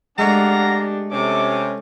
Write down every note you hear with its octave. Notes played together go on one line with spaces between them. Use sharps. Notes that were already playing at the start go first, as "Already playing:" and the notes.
G#3 A3 D4 G4 D5 F5 F#5 A#5
C3 C#4 A4 D6